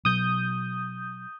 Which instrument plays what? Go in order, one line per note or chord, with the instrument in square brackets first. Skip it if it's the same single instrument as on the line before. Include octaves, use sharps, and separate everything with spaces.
[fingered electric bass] B2 F#3 [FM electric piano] D#6 G6